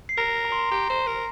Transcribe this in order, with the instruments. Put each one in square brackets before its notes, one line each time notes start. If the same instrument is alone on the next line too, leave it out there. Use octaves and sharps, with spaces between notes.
[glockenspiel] C7
[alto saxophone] A#4 [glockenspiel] A#5 A#6
[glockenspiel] A#5
C6
A#5
[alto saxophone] G4 [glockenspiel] A#5
[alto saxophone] C5
A#4